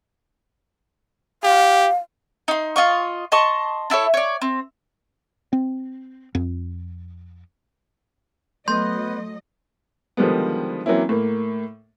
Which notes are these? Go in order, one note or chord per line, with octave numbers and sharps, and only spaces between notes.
G4 F5
D#4 C6
F4 D#5 C#6
D#5 A5 C6 C#6
D4 E4 A4 C#5
C#5 D5
C4
C4
F2
F#3 A3 B3 D#5 C6 G6
D3 D#3 F3 G3 G#3 B3
E3 F#3 A#3 C4 C#4 E4
A2 A#3